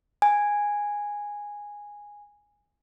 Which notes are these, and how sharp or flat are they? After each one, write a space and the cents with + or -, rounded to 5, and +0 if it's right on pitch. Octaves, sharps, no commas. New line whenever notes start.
G#5 -10